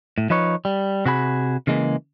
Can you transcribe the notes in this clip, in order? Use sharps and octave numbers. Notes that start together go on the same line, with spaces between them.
A2
F3 D#4 B4 C#5
G3
C3 F#4 G#4 B5
C#3 E3 G#3 A#3